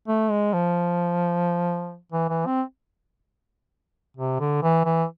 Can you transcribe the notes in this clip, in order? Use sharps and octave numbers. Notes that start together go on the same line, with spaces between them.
A3
G#3
F3
E3
E3
C4
C3
D3
E3
E3